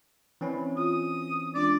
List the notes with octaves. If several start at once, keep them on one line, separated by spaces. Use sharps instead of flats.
E3 C4 C#4 C#5 D5 B5
F4 D#6
G#3 D4 F4 D5